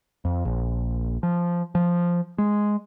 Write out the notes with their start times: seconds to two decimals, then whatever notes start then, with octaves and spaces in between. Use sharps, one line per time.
0.25 F2
0.45 A#1
1.23 F3
1.75 F3
2.38 G#3